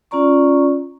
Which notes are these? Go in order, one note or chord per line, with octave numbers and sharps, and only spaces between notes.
C#4 F4 D5 A#5 C#6